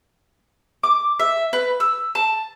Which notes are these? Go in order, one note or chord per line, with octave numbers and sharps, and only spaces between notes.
D6
E5
B4
E6
A5